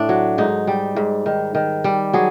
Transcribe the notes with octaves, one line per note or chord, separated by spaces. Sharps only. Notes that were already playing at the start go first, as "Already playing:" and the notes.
Already playing: A2 D4
F#3
G#2 D#4
G3
G#2
D#3
D#3
G3
F#3 G#4